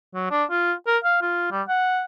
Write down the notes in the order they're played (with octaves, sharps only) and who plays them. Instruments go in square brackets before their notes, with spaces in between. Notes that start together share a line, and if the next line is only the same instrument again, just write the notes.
[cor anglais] F#3
D4
F4
A#4
F5
F4
G3
F#5